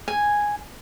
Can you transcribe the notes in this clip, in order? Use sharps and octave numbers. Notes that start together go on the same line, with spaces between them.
G#5